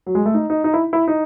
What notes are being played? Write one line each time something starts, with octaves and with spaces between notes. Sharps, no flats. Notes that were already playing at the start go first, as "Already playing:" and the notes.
F#3
G#3
A3
D#4
D#4
D#4
E4
E4
D#4